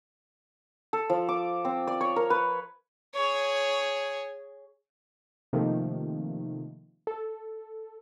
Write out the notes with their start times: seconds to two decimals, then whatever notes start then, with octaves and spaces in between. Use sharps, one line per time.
0.93 A4
1.10 F3
1.29 D6
1.65 C4
1.87 D5
2.01 C#5
2.16 A#4
2.30 B4
3.15 G#4 C#5
5.53 C3 D#3 F3 A3 A#3
7.07 A4